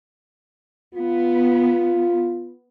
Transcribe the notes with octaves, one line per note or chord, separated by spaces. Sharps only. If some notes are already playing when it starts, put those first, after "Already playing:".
B3 F4